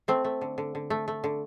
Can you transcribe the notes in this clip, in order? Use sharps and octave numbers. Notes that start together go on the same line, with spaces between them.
A3 C4
A3
D3
D3
D3
A3
A3
D3